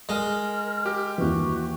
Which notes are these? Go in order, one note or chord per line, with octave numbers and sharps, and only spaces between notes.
G#3 A#4
G4
D#2 E3 F#4